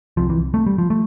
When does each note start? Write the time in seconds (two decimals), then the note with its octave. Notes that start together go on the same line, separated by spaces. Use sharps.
0.17 C2 C3 F3
0.30 E3
0.54 C2 C3 A3
0.66 G3
0.78 F3
0.90 A3